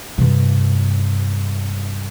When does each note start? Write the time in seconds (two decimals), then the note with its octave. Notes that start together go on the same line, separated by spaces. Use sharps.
0.18 G2 C3